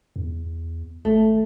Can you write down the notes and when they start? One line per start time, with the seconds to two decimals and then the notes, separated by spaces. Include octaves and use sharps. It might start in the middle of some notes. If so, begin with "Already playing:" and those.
0.16 E2
1.05 G#1 A3